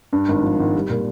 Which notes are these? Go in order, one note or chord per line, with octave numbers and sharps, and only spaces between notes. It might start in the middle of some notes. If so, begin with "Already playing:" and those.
G2
G#1
F3
G#1
G3
A#2